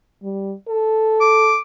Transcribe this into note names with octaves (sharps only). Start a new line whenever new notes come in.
G3
A4
D6